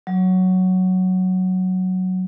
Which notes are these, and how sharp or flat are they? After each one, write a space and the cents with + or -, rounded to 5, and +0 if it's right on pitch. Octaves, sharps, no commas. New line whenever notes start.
F#3 +0